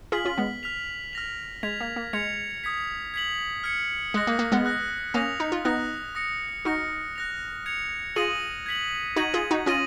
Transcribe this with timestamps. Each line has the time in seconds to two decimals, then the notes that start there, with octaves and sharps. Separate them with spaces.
0.12 F4 G#4 F6 B6 F#7
0.25 C#4 F4
0.38 G#3 B3
0.63 F6 B6 F7
1.13 F6 A#6 F7
1.63 G#3 G#6 B6 F7
1.80 A#3
1.96 A#3
2.13 G#3 G#6 C#7 F7
2.64 D#6 G#6 B6
3.14 G#6 B6 F#7
3.64 F6 G#6 C#7
4.14 G#3 D#6 F#6 A#6
4.27 A#3
4.39 A#3
4.52 G#3 B3
4.65 D#6 F#6 A#6
5.14 A#3 C#4 D#6 A#6 F7
5.40 D#4
5.52 F4
5.65 B3 D#4 D#6 F#6 A#6
6.15 D#6 A#6 C#7
6.65 D#4 F#4 F6 A#6 C#7
7.16 F#6 A#6 F7
7.66 G#6 C#7 F7
8.16 F4 G#4 D#6 A#6 D#7 F#7
8.66 G#6 B6 F#7
9.16 D#4 F#4 G#6 D#7 F#7
9.34 F4 G#4
9.51 D#4 F#4
9.66 C#4 F4 D#6 A#6 D#7 F#7